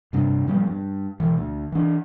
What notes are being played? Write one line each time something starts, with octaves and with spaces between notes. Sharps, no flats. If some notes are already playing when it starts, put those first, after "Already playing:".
G2 C3 D4
A#2 F3 G3 B3
G2
B2 E3
D2
E3 D4